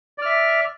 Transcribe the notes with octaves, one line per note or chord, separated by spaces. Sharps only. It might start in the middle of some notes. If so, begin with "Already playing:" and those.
D5 E5 F6